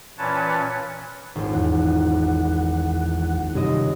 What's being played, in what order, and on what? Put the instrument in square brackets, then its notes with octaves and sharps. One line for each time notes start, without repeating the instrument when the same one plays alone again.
[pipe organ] A#2 E3 C#4 B4 C#5 A5
[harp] D#1 G#1
[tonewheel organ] E2 E3 F#5
[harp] F#2 D#5 [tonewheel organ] C3 D#3 G3